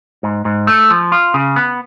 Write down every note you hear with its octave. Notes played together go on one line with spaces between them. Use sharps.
G#2
G#2
A3
F3
F4
C#3
B3